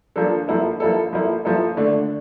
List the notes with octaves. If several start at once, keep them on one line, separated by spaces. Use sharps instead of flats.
F3 A#3 D4 A4
F3 A#3 E4 A4
F3 A#3 E4 A4
F3 A#3 E4 A4
F3 A#3 E4 A4
D3 A3 D4